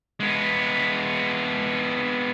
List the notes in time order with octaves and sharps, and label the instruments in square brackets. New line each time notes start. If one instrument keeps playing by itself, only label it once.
[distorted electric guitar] G#3 B3